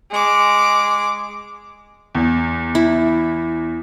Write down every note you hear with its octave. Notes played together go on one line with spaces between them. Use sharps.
G#3 D6
E2
E4